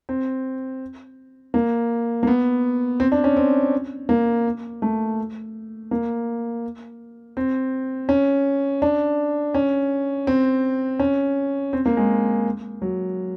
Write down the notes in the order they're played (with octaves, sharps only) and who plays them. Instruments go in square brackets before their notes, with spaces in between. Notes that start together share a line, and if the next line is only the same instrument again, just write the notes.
[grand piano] C4
A#3
A#3
B3
C4
D4
C#4
C4
A#3
A3
A#3
C4
C#4
D4
C#4
C4
C#4
C4
A#3
G#3
F#3